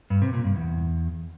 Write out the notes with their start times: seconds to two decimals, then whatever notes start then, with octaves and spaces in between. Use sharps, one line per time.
0.10 G2
0.22 C3
0.33 A#2
0.45 G2
0.56 E2